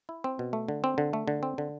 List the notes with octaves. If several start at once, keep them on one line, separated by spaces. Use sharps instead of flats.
E4
C4
B2
A3
D3
C4
D3
A3
D3
C4
D3